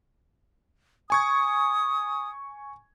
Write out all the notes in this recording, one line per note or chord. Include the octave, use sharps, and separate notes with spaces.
G#5 C#6 D#6 G#6